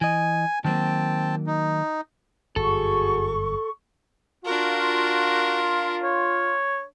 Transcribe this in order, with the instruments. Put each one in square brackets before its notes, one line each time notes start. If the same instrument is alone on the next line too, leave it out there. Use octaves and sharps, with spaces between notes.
[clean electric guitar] E3 D#5 [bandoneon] G#5
[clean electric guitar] D#3 F#3 A#3 [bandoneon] C4 G5 A5
[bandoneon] D#4
[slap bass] G1 F#2 [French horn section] F#4 G#4 [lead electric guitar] A4 [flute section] C#6
[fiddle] D4 A#4 [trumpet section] F4 [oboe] F#4
[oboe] C#5